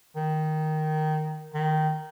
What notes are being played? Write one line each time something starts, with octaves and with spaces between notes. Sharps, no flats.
D#3
D#3